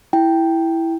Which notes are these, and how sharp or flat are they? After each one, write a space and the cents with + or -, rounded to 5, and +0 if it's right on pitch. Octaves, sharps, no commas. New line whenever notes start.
E4 +0 G5 +0